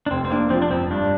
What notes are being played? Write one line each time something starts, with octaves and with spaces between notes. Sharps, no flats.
D4
F1 C4
C4
A#3 D4
F3 C4
D4
F2 C4
G2 D4